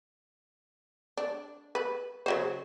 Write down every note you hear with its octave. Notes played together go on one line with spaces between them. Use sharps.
D4
B4
C#3 F#3 C5